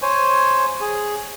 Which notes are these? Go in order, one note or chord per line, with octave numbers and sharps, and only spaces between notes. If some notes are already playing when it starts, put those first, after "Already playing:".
C5 C#5 G#5
G#4